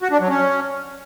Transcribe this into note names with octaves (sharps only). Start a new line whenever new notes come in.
F#4
D4
F#3
C#4